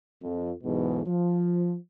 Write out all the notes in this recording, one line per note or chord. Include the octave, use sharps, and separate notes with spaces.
F2
B1 E2 G#2 B2
F3